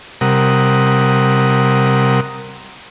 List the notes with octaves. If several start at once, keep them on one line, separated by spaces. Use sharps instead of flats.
C3 G3 A#4 F#5 D#6